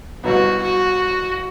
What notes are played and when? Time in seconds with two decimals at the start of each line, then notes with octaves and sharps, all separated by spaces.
0.24 C2 B2 F#3 B3 F#4
0.62 F#4